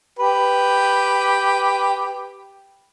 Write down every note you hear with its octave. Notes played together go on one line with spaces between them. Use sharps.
G4 B4